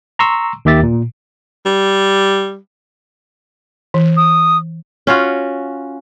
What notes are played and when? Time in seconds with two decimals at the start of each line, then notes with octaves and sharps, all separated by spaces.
0.19 A#5 C6 C#6 E6
0.65 D#2 D#3 G4 E5 A6
0.83 A#2
1.66 G3
3.94 E3
4.17 D#6
5.07 C#4 F4 F#4